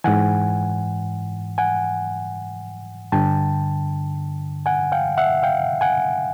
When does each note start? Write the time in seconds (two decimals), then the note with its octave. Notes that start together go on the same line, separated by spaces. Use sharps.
0.04 G#2 E3 F#5 G#5
1.58 F#5 G#5
3.12 G2 D3 G5 A5
4.66 F#5 G#5
4.92 F5 G5
5.18 E5 F#5
5.43 F5 G5
5.81 F#5 G#5